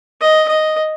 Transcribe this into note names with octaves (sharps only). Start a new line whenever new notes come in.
D#5
D#5